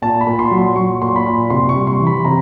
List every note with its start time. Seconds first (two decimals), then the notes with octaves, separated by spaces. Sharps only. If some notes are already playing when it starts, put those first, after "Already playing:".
0.02 A#2 A5
0.21 B5
0.27 A#2
0.39 C6
0.51 F#3
0.58 C6
0.76 F#3 C#6
1.02 A#2 C6
1.16 B5
1.26 A#2 C6
1.50 C3 C6
1.69 C#6
1.76 G3
1.87 C6
2.00 E3
2.07 B5
2.25 C3 A#5